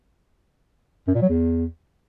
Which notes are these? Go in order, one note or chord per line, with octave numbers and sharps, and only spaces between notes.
F#2
A#2
F#3
E2